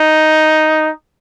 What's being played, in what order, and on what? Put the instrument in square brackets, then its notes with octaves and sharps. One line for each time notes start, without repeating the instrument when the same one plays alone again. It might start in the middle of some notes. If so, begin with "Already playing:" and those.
Already playing: [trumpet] D#4